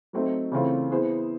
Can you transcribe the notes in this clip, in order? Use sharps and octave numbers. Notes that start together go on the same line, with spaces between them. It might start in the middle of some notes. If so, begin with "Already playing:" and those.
F#3 A3 C4 D#4
C#3 E3 A3 C4 F4
B3 E4 G#4 C5